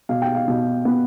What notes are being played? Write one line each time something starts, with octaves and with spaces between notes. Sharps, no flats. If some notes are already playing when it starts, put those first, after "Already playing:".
B2 F5
G5
F5
B2
B3